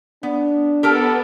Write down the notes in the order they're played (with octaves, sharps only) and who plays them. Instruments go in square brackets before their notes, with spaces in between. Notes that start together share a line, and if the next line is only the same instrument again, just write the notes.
[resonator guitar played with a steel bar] B3 [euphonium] D4
[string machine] B3 [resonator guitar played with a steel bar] G4 A#4 A5 [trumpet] A4